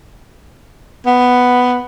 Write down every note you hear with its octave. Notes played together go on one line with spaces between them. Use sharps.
B3